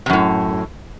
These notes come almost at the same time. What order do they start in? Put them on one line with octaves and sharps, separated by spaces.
C3 F#2 A2